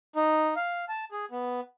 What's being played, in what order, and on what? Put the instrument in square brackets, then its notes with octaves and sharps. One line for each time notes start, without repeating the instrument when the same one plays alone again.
[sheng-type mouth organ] D#4
F5
A5
G#4
B3